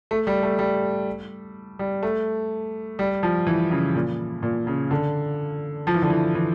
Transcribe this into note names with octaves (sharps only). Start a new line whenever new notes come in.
A3
G3
A3
G3
G3
A3
G3
F3
E3
C#3
A#2
A#2
C#3
D3
F3
E3
D3
E3
E3